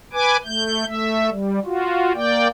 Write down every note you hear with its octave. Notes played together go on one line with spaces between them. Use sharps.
B4 G#5 D6
A3 G6
A3 E5
G3
F4 F#4
A#3 D5 G5